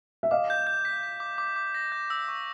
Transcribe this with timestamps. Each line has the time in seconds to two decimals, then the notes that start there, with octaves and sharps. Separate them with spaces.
0.23 E5
0.31 D#5 F5 D6
0.50 G6
0.67 G6
0.85 B6
1.03 B6
1.20 D6
1.38 D6
1.56 D6
1.74 A#6
1.92 G6
2.10 E6
2.28 C#6